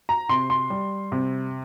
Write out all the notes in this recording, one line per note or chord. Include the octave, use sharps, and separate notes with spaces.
A#5
C3 C6
C6
G3
C3